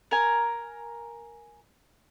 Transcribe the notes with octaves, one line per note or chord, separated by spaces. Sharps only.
A#4 G#5